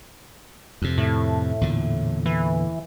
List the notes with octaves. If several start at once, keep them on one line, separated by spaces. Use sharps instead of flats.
F2 C3
A2
E2 A#2 D3
E3